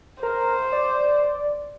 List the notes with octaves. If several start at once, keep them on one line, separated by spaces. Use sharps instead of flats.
A#4 C5
D5